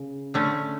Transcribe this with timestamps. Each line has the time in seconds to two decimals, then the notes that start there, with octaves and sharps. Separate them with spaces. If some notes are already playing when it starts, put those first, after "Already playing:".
Already playing: C#3
0.34 D3 A3 C#4